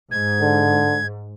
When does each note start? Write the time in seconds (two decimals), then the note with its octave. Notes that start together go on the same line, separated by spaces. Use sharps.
0.11 G#2 G#6
0.41 D3